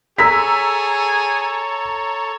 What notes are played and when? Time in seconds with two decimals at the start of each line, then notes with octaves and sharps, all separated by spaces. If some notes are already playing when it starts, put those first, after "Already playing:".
0.18 G#4 A4 C#5 A#5 E6 B6